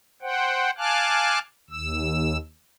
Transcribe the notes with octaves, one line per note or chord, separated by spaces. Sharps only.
C5 F#5 G5
F5 G#5 A5 D6 F6 F#6
D#2 E6